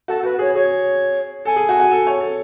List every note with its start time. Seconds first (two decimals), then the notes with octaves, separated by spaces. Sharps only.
0.08 F#4 A4
0.23 F#4 B4
0.39 G#4 C#5
0.55 G#4 C#5
1.45 A4 G#5
1.56 G#4
1.69 F#4
1.80 F#4
1.91 A4
2.07 C#5
2.21 A4